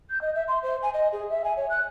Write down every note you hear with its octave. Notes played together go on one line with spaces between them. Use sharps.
G6
D#5
E5
C6
C5
G#5
D#5
G#4
E5
G#5
C#5
F#6